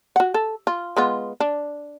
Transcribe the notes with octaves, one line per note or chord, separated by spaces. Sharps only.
F#4 F#5
A4
F4
G#3 B3 F4
D4